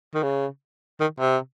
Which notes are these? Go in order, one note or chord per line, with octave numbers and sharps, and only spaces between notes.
D#3
C#3
D#3
C3